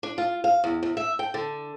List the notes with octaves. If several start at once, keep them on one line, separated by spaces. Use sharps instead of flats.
D4
F4
F5
E2
E2
E5
G5
D3